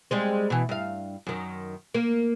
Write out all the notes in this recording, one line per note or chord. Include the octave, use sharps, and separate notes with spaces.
G3 G#3 C4
B2 E3
G2 F5
F#2 D#3
A#3